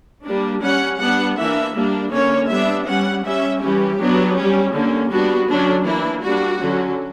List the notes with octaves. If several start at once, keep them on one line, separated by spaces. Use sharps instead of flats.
G3 A#3 D4
G3 C#4 F#5
G3 B3 D4 F#5
E3 A#3 D4 E5
G3 A#3 D4
D3 A#3 C#4 C#5
G3 B3 D4 E5
G3 C#4 F#5
G3 C#4 E5
E3 G3 C#4 G4
F#3 B3 D4
G3 C#4
D3 A#3 C#4
G3 B3 D4 F#4
D3 F#3 C#4 D4
E3 A#3 D4 E4
G3 A#3 D4 F#4
D3 F#3 C#4